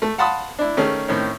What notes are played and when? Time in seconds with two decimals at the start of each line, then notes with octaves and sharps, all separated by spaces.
0.02 A3
0.18 F5 F#5 A5 B5 C6 D#6
0.59 D4 E4
0.77 D#3 A3 C#4 G#4
1.08 A2 D#3 C4 C#4